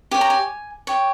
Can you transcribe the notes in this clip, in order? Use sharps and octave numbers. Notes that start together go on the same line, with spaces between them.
G4 C#5 G#5
A#5
G#5
G4 C#5